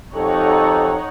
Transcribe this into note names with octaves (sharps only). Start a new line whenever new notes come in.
F2 D#4 G4 A4 C#5 F#5